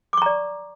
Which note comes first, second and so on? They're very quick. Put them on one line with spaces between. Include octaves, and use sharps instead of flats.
D6 C#6 A#5 D5